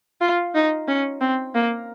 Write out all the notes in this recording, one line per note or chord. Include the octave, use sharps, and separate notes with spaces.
F4
D#4
C#4
C4
A#3